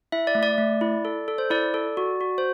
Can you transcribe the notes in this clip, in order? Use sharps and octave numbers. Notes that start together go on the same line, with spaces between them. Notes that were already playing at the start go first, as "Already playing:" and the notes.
E4 E5
D5
A3
D5
A3
E4
A4
A4
C5
E4 D5
A4
F#4
F#4
C5